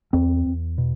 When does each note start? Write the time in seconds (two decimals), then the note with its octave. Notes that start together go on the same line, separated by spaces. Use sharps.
0.13 E2 C4
0.46 E2
0.78 B2